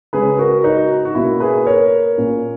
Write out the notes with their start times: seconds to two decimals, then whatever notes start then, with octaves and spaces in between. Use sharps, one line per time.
0.13 C#3 G#3 C#4 G#4 B4
0.39 F#4 A#4
0.64 D#4 F#4
1.05 F#4
1.15 B2 A#3 C#4 E4
1.40 G#4 B4
1.66 A#4 C#5
2.18 A#2 A#3 C#4